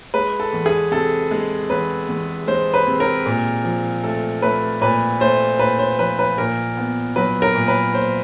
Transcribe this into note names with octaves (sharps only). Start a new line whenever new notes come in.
G#3 B4
A4
E2
G#4
C3 A4
G#3
E2 B4
E2
G#3 C5
B4
C3
A#4
A#2
F3
A3 A4
A3 B4
A#2 B4
A3 C5
A#2 B4
C5
F3 B4
B4
A#2 A#4
B3
F#3 B4
A#4
A#2
B4
A#2 C5